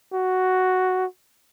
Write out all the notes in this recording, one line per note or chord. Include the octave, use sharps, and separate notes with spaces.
F#4